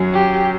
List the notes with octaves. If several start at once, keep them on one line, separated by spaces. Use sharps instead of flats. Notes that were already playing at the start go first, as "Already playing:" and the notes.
Already playing: F#2 F#3
G4